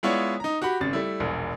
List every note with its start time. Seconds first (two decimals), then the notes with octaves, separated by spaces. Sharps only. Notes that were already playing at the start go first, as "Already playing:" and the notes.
0.03 G#3 B3 E4 F4 C#5 D5
0.40 D#4 A#5
0.62 F#4 G4 F#5 B5
0.80 G#1 C#3 A6
0.93 G3 A3 E4
1.20 E1 A#1